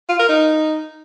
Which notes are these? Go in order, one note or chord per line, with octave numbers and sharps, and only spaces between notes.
F4
A#4
D#4